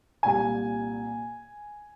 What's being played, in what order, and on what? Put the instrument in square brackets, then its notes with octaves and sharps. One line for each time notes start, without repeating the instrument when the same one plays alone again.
[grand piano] C2 A#2 G3 G#5